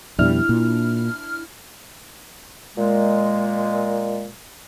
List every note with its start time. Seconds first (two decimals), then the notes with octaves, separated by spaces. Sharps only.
0.19 F2 B2 G3 D4 E4 F6
0.49 A#2
2.78 A#2 G#3